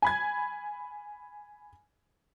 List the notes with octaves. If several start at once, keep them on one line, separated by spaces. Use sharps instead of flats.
G#5 B5 G#6